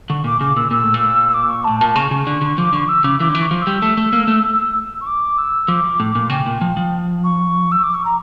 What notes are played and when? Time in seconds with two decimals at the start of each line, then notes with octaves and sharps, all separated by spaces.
0.09 D3 C#6
0.24 A#2 D6
0.41 C#3 D6
0.56 A#2 E6
0.71 A#2 E6
0.83 A2
0.94 A#2
1.29 E6
1.34 D6
1.48 C#6
1.64 A2 A5
1.79 A#2 A5
1.96 C#3 C#6
2.11 C#3
2.27 D3
2.42 D3
2.58 F3 D6
2.73 D3 C#6
2.88 E6
3.04 C#3 D6
3.20 E3 D6
3.29 D3
3.35 E3
3.41 C#6
3.51 F3
3.61 E6
3.67 G3
3.82 A3
3.97 A3
4.13 A#3
4.28 A3
5.01 C#6
5.06 D6
5.38 E6
5.68 F3 D6
6.00 A2
6.15 A#2
6.30 C#3 G5
6.46 A#2
6.61 F3
6.77 F3
7.24 C#6
7.71 E6
7.83 D6
7.94 C#6
8.05 A#5